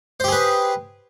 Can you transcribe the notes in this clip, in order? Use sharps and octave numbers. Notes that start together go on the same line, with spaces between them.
G4 G#4 B4 C5